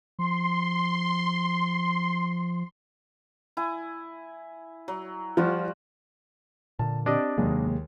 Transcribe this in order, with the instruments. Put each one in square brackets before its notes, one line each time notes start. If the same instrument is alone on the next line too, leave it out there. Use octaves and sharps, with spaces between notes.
[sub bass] F3 [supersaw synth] C6
[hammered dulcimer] E4 G#5
F#3
[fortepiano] F3 [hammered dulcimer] G3 F4 F#4
[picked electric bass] A#2 D3 [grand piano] A5
[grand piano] C4 G4 [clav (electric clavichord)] D4 D5 D#5
[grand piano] D#2 G#3 [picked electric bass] C3 F#3 A#3